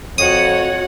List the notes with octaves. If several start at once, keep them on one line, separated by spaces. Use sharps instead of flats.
F2 F#4 C#5 F#5 D#6